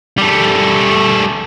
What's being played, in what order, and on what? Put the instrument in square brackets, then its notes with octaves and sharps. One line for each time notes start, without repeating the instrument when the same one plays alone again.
[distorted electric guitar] G3 A3